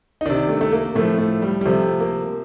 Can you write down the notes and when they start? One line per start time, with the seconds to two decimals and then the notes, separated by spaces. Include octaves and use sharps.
0.21 D#4
0.25 C3 D#3 D4
0.49 A3
0.61 A3
0.72 A#3
0.95 A2 F3 A3
1.18 A3
1.42 G3
1.61 G3
1.65 C3 F3 A3
2.00 A#3